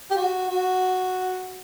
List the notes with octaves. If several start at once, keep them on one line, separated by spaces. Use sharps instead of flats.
G4
F#4
F#4